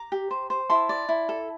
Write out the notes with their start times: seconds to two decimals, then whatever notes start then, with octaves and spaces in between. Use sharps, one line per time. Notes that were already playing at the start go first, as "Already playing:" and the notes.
Already playing: A#5 D6
0.12 G4
0.31 C5
0.50 C5
0.70 E4 A5 C6
0.89 D5
1.09 E4
1.29 A4